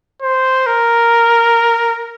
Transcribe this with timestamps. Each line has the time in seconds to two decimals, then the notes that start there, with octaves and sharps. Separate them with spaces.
0.22 C5
0.66 A#4